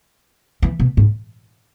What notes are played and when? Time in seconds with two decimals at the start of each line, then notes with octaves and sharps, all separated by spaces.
0.62 E3
0.80 B2
0.97 G#2